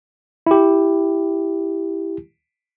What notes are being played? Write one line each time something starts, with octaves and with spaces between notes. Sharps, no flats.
E4 G4